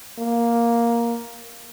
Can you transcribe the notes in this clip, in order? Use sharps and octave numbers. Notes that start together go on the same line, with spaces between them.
A#3